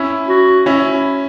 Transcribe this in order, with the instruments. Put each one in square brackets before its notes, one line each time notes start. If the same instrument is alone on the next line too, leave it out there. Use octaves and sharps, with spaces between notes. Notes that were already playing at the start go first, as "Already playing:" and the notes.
Already playing: [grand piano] C#4 E4
[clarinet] F#4
[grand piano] C#4 E4